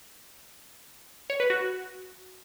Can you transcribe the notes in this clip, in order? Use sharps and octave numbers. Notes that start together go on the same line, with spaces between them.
C#5
B4
F#4